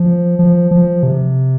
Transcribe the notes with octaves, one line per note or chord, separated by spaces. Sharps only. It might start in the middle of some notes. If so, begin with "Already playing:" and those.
Already playing: F3
F3
F3
C3